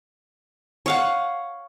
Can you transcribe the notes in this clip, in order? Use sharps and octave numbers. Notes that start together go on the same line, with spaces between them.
C#5 F5 F#5